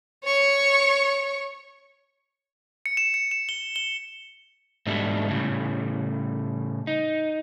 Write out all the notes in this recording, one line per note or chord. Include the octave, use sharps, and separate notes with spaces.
C#5 C#6
C#7
E7
C#7
E7
G7
G7
G#2 B2 G3 A3 D4
A2 C#3 G3
D#4